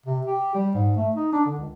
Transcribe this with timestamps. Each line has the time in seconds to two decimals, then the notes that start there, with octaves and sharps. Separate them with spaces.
0.06 C3
0.27 G4
0.55 G3
0.75 G#2
0.97 A3
1.16 D#4
1.33 D4
1.46 D3
1.58 C#2